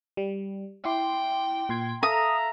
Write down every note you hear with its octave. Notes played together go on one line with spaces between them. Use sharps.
G3
E4 G5 C6 D6
A#2 C6 G#6
A4 E5 F5 A#5 D#6